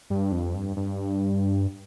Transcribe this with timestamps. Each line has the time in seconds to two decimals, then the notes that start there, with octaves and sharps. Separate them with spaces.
0.10 G2
0.32 F2
0.54 G2
0.76 G2